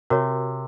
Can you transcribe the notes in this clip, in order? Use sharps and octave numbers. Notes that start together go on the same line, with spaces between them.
C3 F#4 A#4 C#5